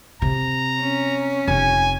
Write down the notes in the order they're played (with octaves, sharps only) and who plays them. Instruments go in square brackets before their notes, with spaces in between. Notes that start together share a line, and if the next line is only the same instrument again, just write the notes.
[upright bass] C3 [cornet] A#5
[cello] C#4
[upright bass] F1 [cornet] G#5